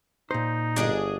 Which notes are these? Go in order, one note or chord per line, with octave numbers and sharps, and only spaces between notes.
A#2 D#4 C5
G1 D4 G#4 D#5